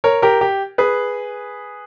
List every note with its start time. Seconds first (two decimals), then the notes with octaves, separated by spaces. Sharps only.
0.04 A#4 C#5
0.22 G4 A#4
0.41 G4
0.78 G#4 B4